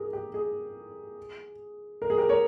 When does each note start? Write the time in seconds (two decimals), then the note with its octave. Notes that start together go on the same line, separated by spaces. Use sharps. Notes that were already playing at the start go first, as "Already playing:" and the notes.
Already playing: G4 G#4 A#4
0.13 G4
0.34 G#4
2.02 A#4
2.10 G#4
2.18 G4 A#4
2.29 A#4 C#5